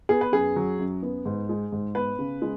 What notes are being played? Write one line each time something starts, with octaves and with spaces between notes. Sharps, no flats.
B3 G#4
B4
F#2 G#4
F#3
F#2
B3
G#2
G#3
G#2
B3 B4
C#3
G#3